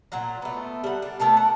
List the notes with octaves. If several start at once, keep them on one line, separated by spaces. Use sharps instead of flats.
A#2 F#3 F#5 A#5
A3 B3
G3 F#5
D4
A3 B3 A4 A#4
F#5